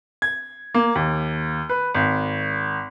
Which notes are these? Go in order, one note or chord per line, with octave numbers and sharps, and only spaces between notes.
G#6
A#3
D#2
B4
G#1